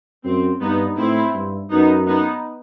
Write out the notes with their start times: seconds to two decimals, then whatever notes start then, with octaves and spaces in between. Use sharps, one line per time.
0.24 F#2 C4
0.61 G2 B3 D#4
0.97 A2 C4 E4
1.34 G2
1.71 F#2 B3 D#4
2.07 B3 D#4